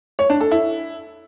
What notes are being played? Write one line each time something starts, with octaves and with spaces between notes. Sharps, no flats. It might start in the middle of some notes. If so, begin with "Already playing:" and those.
C#5
D4
A4
E4